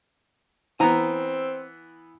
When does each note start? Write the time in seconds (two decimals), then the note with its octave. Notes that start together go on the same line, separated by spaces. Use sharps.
0.80 E3 B3 C4 G#5 A#5